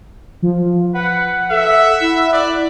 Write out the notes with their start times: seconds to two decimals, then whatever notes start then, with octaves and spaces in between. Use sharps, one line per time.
0.42 F3
0.94 B4 F#5
1.50 A4 E5
2.01 E4
2.33 D5 F#6